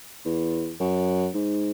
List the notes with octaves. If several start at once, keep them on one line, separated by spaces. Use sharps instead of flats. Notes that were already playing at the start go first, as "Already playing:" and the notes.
E2
F#2
G#2